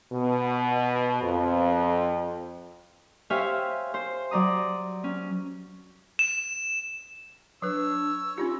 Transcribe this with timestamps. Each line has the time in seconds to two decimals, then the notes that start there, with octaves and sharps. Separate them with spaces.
0.12 B2
1.22 F2
3.30 G4 C5 C#5 E5 F5 G#5
3.94 C5
4.31 F#3 D5 A#5 D#6
5.04 C#4
6.19 E7
7.62 F#3 D4 B4 C#5 E6
8.38 C#4 D#4 F4 G4